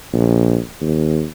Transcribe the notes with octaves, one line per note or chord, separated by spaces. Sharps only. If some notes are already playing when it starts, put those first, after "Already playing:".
A#1
D#2